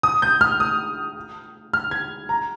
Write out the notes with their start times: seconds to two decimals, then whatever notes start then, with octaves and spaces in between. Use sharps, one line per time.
0.03 D#6
0.22 G6
0.41 F6
0.60 D#6
1.73 F6
1.91 G#6
2.29 A#5